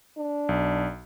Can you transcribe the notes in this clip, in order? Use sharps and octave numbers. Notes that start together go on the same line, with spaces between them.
D4
B1